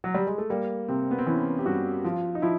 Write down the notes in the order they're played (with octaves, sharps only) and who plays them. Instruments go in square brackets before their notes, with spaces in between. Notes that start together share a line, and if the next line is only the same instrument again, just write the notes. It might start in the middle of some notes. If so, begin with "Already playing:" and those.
[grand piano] F#3
G3
G#3
A3
[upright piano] G3 [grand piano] A#3
[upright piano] C3 [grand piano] C4
[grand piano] B3
C4
[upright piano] E3 [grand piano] C#4
[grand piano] G4
[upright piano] G2 [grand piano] F#4
[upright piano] F3 [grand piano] F4
[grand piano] D#4
[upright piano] F3 [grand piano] E4